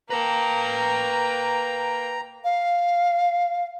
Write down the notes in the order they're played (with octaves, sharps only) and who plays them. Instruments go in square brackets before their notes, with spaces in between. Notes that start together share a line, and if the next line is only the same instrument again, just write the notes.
[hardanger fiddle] A#3 G5 [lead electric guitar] B4 A5 [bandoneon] A#5
[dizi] F5